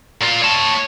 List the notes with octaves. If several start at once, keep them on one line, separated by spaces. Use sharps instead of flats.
A#2 F4
C#5 A5